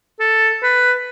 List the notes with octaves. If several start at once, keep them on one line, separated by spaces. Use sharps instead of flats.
A4
B4